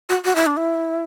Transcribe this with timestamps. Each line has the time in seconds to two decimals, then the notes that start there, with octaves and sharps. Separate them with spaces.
0.09 F#4
0.25 F#4
0.36 E4
0.46 D4
0.57 E4